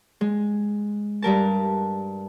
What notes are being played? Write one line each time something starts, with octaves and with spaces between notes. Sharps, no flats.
G#3
G2 G3 A#4 A5